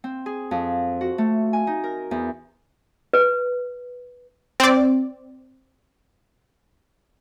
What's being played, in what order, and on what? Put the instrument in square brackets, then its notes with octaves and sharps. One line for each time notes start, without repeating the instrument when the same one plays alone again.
[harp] C4
G#4
F2
F#4
A3
G#5
D#4
A#4
E2
[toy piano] B4
[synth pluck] C4 D5